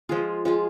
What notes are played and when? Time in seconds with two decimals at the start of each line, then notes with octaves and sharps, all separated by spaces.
0.09 F3 G#3 F4 G#4
0.45 F3 G#3 F4 G#4